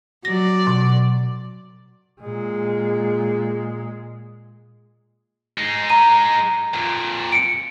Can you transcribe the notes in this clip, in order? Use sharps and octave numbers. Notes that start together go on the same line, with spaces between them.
F#3 D5 A#6
B2
A#2 G#3
G#3 D#4
A#5 D#7
F2 A#2
C#7 D7